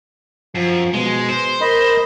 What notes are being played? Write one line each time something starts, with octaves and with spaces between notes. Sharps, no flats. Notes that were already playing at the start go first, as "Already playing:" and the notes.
F#2 F3
B2 G#3
C5
A#4 D#5 B5